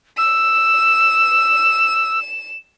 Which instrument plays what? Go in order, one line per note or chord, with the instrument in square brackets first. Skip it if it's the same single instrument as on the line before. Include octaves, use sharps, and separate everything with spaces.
[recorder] E6 [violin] E7